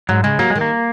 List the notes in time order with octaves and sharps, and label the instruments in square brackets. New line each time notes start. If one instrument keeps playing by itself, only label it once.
[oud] G#2 [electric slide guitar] F#3
[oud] C#3 [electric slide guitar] G#3
[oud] F#3 [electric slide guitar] A#3
[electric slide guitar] G#3
[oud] D#3
[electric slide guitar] A#3